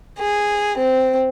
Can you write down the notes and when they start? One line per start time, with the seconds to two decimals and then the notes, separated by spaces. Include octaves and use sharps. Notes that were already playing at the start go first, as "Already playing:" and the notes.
0.19 G#4
0.78 C4